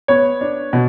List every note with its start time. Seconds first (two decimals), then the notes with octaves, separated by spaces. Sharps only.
0.08 B3 C#5
0.41 D4
0.73 B2